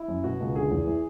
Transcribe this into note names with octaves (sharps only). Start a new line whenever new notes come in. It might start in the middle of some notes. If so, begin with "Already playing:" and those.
Already playing: E4
F#2
B2 F#4
C#2
D3 G#4
E2
E3